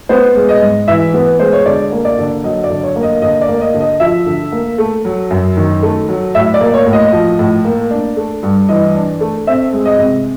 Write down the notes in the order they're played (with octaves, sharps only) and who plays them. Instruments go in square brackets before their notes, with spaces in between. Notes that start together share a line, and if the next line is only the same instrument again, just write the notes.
[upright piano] B3 C5
G#3
D#5
G#2
E3 E5
B3
G#3 C5
C#5
D3 D5
A#3
D5
D3
F#3 D#5
D5
D3
C#5
A#3
D#5
D3 D#5
D5
A#3
D#5
D3
D#5
F3 E5
D3
A#3
A3
F#3
F#2
D#3
A3
F#3
A2 E5
D5
A#3
C#5
A2
D#5
F3
A2
A#3
D4
A3
G2
E3 D#5
D4
A3
C4 E5
G#3
D#5
C3